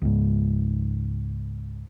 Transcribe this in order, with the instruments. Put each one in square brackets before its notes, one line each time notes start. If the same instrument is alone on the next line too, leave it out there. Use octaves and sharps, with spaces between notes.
[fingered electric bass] C#2 G#2